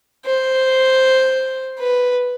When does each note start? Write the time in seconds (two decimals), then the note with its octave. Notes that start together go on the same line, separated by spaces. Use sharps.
0.26 C5
1.79 B4